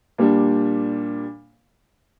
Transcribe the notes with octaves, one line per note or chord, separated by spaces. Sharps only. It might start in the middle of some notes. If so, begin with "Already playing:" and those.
A#2 G3 D4